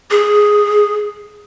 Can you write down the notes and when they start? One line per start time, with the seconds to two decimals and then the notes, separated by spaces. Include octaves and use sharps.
0.10 G#4